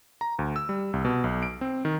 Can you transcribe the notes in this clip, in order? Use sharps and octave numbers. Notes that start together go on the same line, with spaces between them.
A#5
D2
E6
G3
C2
B2
B1
D7
C4
D#3